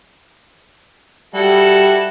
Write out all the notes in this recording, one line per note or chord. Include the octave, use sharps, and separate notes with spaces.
G3 E4 F#4 A4